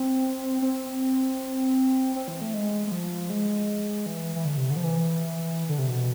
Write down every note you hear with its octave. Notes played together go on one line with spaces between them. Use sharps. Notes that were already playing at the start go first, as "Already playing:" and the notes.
Already playing: C4
C4
C4
E3
A3
G#3
G#3
F3
G#3
E3
E3
D3
C3
D3
F3
E3
D3
C3
B2